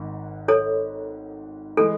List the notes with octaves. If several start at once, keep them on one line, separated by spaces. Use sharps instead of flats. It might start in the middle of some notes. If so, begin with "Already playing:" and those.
Already playing: G#1 G#2 D#3
A4 C#5
E3 G#3 A4